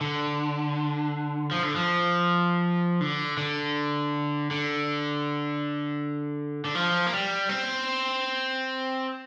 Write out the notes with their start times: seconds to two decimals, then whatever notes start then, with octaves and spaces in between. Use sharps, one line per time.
0.01 D3
1.51 F3
1.63 D3
1.76 F3
3.01 D3
3.37 D3
4.51 D3
6.65 D3
6.75 F3
7.06 A#3
7.13 G3
7.49 C4